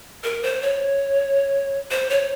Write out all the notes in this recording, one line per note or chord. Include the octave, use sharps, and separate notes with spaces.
A#4
C5
C#5
C5
C#5